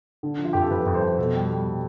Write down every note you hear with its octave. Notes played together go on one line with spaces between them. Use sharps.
D3
F3
F4
F2 G4
A4
F2 B4
F2
C5
F2
B2 A4
G3
G3
B2